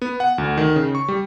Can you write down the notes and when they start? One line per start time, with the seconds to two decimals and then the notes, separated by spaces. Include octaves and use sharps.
0.02 B3
0.20 F#5
0.38 D2
0.57 D#3
0.76 C#3
0.95 C#6
1.08 G3